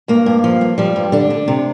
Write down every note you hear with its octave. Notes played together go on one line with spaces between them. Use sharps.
G2 A#3
G2
F3
G2
F3 G3
G2
D3 D4
D3
C3